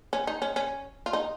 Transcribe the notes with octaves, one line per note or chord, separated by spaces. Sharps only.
C#4
D#4
C#4
C#4
F4
D#4